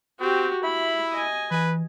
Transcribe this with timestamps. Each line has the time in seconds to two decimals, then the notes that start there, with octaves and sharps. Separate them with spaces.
0.20 C4 F#4 G4
0.63 E4 E5 B5
1.12 D#5 G#5
1.51 E3 B4